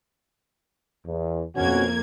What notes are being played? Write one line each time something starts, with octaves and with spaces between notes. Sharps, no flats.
E2
F2 B2 A#3 C#4 F#4 G#6